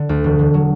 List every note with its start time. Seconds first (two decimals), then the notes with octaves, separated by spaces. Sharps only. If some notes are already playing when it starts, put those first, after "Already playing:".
Already playing: D3
0.09 D2
0.24 E1
0.39 E1
0.54 F#3